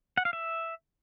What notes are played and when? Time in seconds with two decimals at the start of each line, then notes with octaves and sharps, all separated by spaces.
0.17 F#5
0.25 F5
0.33 E5